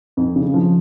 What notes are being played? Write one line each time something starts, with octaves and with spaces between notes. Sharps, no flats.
F2
C#3
F3